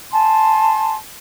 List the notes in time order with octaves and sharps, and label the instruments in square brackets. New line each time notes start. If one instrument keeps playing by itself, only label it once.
[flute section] G#5 A5 C6